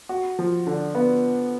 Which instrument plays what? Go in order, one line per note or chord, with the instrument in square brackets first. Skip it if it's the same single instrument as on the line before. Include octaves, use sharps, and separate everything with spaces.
[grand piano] F#4
F3
D3
B3